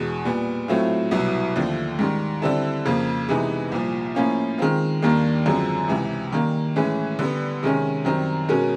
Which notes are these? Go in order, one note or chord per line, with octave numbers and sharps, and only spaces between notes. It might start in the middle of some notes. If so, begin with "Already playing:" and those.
Already playing: E2 B2 G#3
A#2 G3 B3
A2 F#3 A3 C4 F4
C2 B2 F#3 B3 E4
D#2 D3 F3 A3
G#2 D#3 G3
D3 G3 C4 E4 A4
F2 C#3 F3 A#3
C3 E3 G#3 B3 D#4
C2 A#2 F3
A2 F3 A#3 C#4 F4
D#3 G#3 C4 F4
D#2 D#3 G3 A#3 D4
F#2 D3 F3 G#3 C4
C#2 C3 E3
D#3 G3 A#3
A2 E3 G#3 C#4
D3 G3 B3
C3 D#3 G#3 C#4
F#2 D#3 G3 C4
B2 G#3 C#4 F#4 A#4